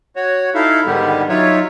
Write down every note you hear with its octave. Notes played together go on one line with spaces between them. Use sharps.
F#4 C#5
D#4 E4 A4 E5 F5
G#2 D3 D#3 G3 B3 G4
F#3 D#4 F4 C#5 E5